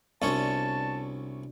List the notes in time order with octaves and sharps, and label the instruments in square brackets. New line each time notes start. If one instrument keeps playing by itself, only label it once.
[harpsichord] C2 C#4 C#5 [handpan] B3 D4 F#4 [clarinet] A5